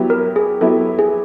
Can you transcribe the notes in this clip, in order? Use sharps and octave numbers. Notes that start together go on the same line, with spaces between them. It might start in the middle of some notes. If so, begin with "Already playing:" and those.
Already playing: F#3 B3 E4 G4
A#4
G#4
F#3 B3 E4 G4 A4
G#4